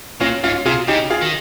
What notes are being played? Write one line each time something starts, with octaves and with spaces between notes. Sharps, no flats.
A#2 C#4 F4
G#2 C#4 F4
C3 F4 G#4
C#3 D#4 G4
F4 G#4
D#3